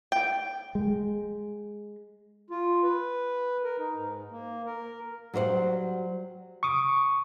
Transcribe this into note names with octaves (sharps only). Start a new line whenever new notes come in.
G5
G#3
F4
B4
A#4
D#4
G#2
A#3
A#4
F#3 G3 C5 C#5 F#5
C#6 D#6